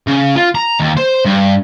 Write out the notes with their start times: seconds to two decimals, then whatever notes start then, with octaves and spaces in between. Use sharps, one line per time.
0.07 C#3
0.36 F4
0.55 A#5
0.80 D#2
0.97 C5
1.25 G2